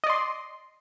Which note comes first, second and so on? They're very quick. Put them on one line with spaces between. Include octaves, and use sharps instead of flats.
D#5 D5 C6